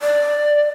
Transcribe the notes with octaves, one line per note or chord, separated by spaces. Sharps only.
D5